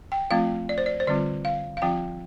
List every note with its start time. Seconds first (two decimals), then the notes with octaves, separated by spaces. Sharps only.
0.12 G5
0.31 F3 A3 C4 F4 F5
0.69 D5
0.78 C5
0.86 D5
1.00 C5
1.07 D3 G3 C4 F4 D5
1.45 F5
1.77 F5
1.82 F3 C4 F4 G5